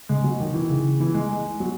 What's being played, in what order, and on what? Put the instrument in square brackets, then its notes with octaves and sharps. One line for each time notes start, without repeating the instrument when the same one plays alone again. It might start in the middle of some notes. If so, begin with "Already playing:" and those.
[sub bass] C#3 [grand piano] G#3
[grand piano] F#3
D#3
E3
[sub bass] C#3
[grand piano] E3
G#3
G#3
F#3